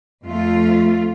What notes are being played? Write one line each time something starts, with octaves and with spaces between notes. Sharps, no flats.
F2 A3 F4